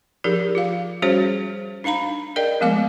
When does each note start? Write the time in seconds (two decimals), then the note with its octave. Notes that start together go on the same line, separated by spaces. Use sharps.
0.24 F3 D#4 G4 G#4 A#4
0.55 F4 F5
1.02 G3 C#4 F#4 G#4 C5 C#5
1.84 D4 D#4 F5 A#5 B5
2.36 G#4 A#4 D5 D#5 G5
2.61 F3 G#3 A3 B3 F5 D6